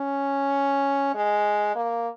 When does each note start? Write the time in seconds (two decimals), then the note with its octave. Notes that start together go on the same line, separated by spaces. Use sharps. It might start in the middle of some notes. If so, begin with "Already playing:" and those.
Already playing: C#4
1.15 G#3
1.76 A#3